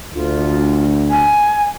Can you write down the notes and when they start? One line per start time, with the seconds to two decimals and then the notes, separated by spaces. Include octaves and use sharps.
0.14 D2 F4
1.10 G#5